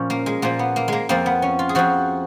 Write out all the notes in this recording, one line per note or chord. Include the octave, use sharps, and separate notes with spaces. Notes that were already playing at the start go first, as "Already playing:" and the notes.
Already playing: A#2 F3 C#4
A#3
G#3
A#2 F3 A#3
B3
A#3
G#3 A#3
F2 F3 A#3
B3
C#4
F4
G#4
F2 F3 F#4